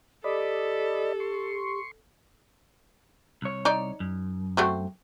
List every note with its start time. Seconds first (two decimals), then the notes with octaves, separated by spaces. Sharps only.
0.24 G4 A4 D5 D#5 B5
1.20 C6 C#6
3.42 C2 C#5
3.65 D#4 D5
4.00 F#2
4.57 A3 C4 F#4